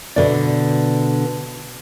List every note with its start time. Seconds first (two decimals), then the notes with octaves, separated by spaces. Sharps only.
0.16 B2 D3 D5